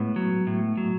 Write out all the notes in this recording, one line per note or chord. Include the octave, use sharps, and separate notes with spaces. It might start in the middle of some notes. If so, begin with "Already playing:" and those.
Already playing: A2 G#3 B3
F#3
A2
F#3